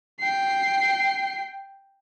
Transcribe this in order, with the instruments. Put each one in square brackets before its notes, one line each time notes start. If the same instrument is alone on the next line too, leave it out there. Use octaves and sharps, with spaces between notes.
[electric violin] G5 C7